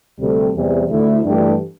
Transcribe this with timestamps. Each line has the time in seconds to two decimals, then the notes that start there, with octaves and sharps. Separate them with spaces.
0.19 D2 C3 G3 C4 A4
0.54 E2 C3 E3 G3
0.90 D2 D3 A3 E4
1.25 G2 E3 A3 D4 G4